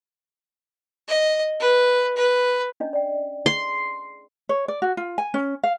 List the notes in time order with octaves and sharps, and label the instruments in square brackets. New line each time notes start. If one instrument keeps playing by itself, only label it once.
[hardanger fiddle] D#5
B4
B4
[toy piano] C#4 D4 D#5
D5 G5
[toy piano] G#4 [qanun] C6
[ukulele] C#5
D5
F#4
F4
G#5
C#4
F5